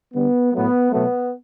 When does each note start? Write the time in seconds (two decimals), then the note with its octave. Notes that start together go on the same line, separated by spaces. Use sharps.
0.14 D3 G3 B3
0.54 A2 F#3 A3 B3
0.92 B2 F#3 A3 B3